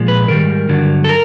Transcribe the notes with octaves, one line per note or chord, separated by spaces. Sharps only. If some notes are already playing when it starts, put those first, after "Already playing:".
Already playing: A#2 F3 G#3
B4
G#2 D#3 G3 A#4
G2 D3 F#3
A4
A#4